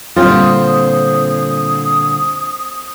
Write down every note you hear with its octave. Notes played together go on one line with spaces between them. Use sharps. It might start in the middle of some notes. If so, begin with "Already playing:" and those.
A#2 D3 G3 C4 F4 D#6